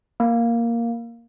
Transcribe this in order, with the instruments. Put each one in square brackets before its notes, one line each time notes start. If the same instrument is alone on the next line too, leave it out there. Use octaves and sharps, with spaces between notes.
[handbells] A#3